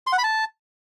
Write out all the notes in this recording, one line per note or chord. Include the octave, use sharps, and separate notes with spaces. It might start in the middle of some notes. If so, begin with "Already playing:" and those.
C6
F#5
B5
A5